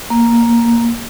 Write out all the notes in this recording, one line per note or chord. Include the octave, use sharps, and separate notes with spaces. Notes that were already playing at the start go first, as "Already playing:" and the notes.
A#3